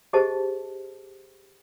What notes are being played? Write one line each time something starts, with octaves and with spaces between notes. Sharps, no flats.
G4 G#4 C5 D#5 A5